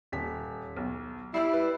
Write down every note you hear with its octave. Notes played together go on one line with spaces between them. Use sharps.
D#1 B6
B1
G3 E4 E6 C7
B4